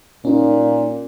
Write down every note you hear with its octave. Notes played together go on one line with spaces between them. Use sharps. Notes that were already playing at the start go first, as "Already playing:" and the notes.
A#2 C#4 D#4